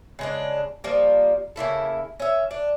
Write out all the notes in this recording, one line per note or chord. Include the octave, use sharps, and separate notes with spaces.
C#3 G#3 D4
F3 G3 A#3
C#3 A#3 E4 A4
C#4 E5
D4